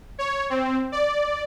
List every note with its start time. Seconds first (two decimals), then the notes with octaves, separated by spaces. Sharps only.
0.19 C#5
0.50 C4
0.92 D5